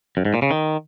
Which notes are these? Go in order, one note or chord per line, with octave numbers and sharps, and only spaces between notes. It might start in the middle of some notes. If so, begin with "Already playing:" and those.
F#2
G#2
A#2
C#3
D#3